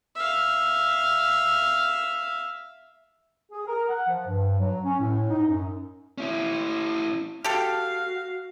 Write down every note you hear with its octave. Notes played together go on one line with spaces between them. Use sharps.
E5 F5
G#4
A#4
F#5
F3
G2
F#3
C#4
A2
D#4
F#2
C#4 E4
F#4 G4 A4 F5